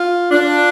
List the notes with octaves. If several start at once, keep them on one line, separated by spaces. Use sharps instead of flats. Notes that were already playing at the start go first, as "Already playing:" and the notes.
Already playing: F4
D4 F4